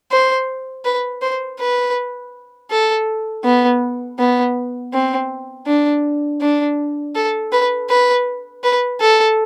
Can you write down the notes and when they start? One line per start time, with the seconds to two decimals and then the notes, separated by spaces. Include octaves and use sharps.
0.12 C5
0.85 B4
1.22 C5
1.59 B4
2.71 A4
3.44 B3
4.19 B3
4.93 C4
5.67 D4
6.41 D4
7.15 A4
7.53 B4
7.90 B4
8.64 B4
9.01 A4